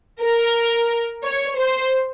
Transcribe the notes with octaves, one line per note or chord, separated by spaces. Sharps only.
A#4
C#5
C5